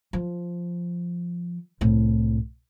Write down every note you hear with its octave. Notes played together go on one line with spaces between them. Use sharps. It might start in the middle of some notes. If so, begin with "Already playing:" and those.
F3
C2 A2